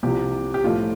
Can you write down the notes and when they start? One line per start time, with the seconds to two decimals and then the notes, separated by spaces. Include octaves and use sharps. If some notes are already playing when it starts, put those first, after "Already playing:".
0.03 C2 C3 F3 G4
0.54 G4
0.64 A2 F3 A3 F4